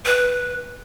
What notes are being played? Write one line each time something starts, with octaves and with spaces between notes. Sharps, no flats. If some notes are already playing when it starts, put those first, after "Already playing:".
B4